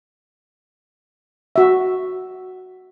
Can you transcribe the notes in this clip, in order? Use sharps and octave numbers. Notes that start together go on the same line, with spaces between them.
F#4 E5